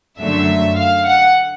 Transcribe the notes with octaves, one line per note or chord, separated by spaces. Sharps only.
F#2 D3 F#3 A3 E5
F5
F#5